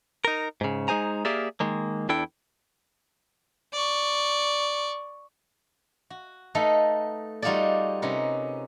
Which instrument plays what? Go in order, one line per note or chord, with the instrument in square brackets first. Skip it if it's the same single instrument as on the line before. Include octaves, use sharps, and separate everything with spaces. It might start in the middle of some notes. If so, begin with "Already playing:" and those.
[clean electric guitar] D#4 A#4
G#2 C#3
G#3 D#4 G#4 C5 G#5 A#5
A#3 G4 G#4 A#4 D5 E5
D#3 G#3 A#3
E2 D4 E4 A4 G5
[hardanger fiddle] D5 C#6
[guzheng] F#4
A3 D#4 A4 B4 D#5 F5
G3 D#4 F4 F#4 G#4 D5
C3 C#4 D#4 A#4 B4